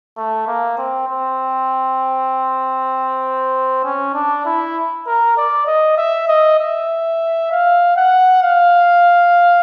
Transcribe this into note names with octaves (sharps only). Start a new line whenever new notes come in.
A3
A#3
C4
C4
C#4
D4
E4
A#4
D5
D#5
E5
D#5
E5
F5
F#5
F5